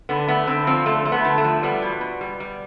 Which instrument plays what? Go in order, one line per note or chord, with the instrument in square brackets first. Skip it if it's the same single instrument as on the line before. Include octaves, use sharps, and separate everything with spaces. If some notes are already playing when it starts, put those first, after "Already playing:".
[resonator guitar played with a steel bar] D3 B3
A3 B3
D3 C4
F3 C4
D3 A3
A3
B3
D3
A3
F3
G3 B3
B2
B2
G3
G3